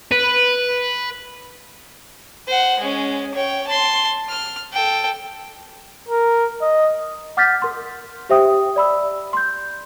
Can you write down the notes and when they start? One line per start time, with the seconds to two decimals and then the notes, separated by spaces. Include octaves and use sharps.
0.11 B4
2.47 C5 F#5
2.80 G#3 C#4
3.34 C#5 G5
3.67 A5 C6
4.29 F6
4.73 A4 G5
6.09 A#4
6.62 D#5
7.37 F#5 D6 F6 G6 A6 B6
7.62 A#4 C6
8.29 G4 C5 E5 G5 D#6
8.76 D5 B5 E6
9.33 C6 G6